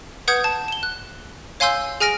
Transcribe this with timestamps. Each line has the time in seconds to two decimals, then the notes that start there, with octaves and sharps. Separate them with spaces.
0.28 B4 F#5 D#6 G6 G#6
0.44 A5
0.68 E7 G7
0.83 F#6
1.60 C#5 F5 G#5 C6 E6 G6
2.00 G#4 G#5 F6 A#6 D7